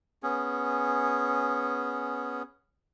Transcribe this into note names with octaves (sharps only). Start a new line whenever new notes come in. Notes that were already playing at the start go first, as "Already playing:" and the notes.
B3 C#4 G#4